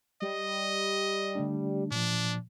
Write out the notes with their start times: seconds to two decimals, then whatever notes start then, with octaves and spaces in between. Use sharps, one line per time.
0.22 G3 D#5
1.35 D3 A3 D4
1.91 A#2 F3 D4